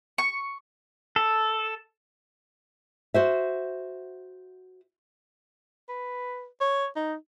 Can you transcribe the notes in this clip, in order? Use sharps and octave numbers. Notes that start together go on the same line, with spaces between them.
C#6
A4
F#4 C5 E5
B4
C#5
D#4